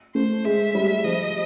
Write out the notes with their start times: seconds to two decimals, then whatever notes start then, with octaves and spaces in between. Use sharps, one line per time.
0.15 A3 C5
0.45 G#3 E5
0.75 G3
1.04 F3 D#5